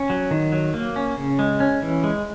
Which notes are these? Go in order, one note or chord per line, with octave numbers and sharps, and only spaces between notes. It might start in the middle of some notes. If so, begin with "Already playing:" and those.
Already playing: C#4
F#3
D#3
F#3
A#3
C#4
C#3
G#3
C#4
E3
G#3